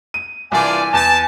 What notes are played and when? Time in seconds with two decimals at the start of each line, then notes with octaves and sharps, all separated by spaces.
0.14 D#7
0.52 C2 E3 D4 F4 D5 G#5
0.93 E2 A5